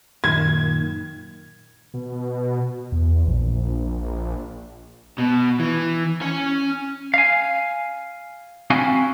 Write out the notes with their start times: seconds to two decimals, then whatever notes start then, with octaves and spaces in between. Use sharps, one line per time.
0.24 F#2 A#2 D#3 G#6
1.94 B2
2.92 E2
3.27 A#1
5.18 B2
5.60 E3
6.22 C#4 G#5
7.14 F5 G#5
8.70 C4 C#4 E4 F#4 F5 G#5